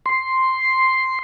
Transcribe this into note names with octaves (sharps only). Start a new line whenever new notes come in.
C6